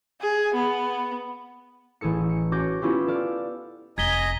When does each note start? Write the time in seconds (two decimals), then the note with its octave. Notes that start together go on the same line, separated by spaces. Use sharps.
0.21 G#4
0.54 B3
2.01 A1 G#4 A4 C#7
2.29 C#7
2.52 C#4 F#4 C#6 D6 G6 A#6
2.82 B3 C#4 E4 F4 G4
3.08 A4 D5 F6
3.98 F1 D#5 G#5 A#5 G#6 B6 G7